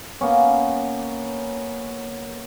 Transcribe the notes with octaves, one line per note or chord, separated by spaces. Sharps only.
A#3 B3 C#4